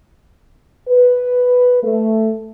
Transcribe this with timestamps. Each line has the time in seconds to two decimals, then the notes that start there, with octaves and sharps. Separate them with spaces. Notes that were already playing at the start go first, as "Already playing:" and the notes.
0.88 B4
1.83 A3